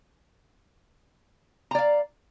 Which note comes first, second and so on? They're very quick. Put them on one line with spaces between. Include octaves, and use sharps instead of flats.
A#5 D5 F5